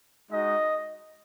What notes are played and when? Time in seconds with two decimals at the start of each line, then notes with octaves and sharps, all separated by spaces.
0.30 G#3 D#4 F#4 D#5